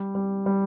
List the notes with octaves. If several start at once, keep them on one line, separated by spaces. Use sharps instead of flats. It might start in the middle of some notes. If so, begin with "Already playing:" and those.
Already playing: G3
G3
G3